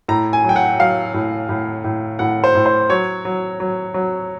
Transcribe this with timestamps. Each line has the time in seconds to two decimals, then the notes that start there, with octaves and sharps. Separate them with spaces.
0.09 A2 A#5
0.33 G#5
0.44 F#3 G5
0.56 F#5
0.79 F#3 F5
1.14 A2
1.49 A2
1.84 A2
2.19 A2 F#5
2.44 C5
2.55 A2
2.66 C5
2.90 F#3 C#5
3.25 F#3
3.60 F#3
3.94 F#3